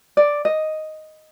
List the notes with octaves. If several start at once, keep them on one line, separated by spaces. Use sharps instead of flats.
D5
D#5